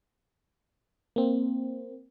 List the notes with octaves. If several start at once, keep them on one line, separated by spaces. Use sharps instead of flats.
A#3 C4